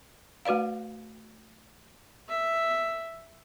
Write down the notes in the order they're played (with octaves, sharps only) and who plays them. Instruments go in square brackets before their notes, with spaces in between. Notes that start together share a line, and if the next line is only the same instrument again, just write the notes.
[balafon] A3 F#4 B4 D5 F5
[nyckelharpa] E5